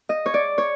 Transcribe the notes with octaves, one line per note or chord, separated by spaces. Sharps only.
D#5
C#5
D5
C#5